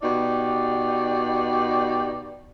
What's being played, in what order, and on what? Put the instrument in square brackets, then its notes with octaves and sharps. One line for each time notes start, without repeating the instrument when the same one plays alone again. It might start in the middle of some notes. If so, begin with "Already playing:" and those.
[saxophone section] B2 D#4 G4 D5